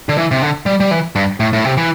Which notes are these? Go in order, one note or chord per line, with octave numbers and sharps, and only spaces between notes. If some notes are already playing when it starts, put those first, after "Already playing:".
D3
E3
C3
D3
G3
G3
E3
G2
A2
A2
C3
E3